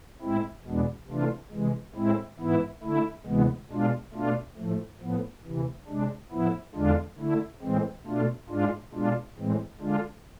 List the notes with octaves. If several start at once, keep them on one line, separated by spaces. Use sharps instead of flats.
A2 G#3 C4 E4
E2 B2 G#3 B3 D4
C3 E3 A3 D4 F4
C3 E3 G#3
A2 G#3 C4 E4
G#2 E3 B3 E4
D3 A3 E4
D2 C3 E3 G#3 B3
B2 G#3 D4 F4
B2 A3 D4 F4
A2 F3 A3
A2 F3 B3
D2 C3 E3
C3 G#3 D4
A2 F3 B3 E4
E2 D3 G#3 D4 F4
D3 A3 E4
A2 E3 G#3 C4
B2 A3 D4 F4
G#2 G#3 D4 F4
B2 G#3 D4 F4
A2 E3 G#3 C4
D3 G#3 D4 F4